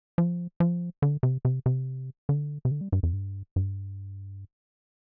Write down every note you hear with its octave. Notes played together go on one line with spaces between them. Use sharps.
F3
F3
D3
C3
C3
C3
D3
C3
D3
G3
G2
F2
G2
G2